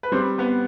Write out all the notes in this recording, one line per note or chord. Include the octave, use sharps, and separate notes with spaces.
B4
G3 C4 C5
B3 B4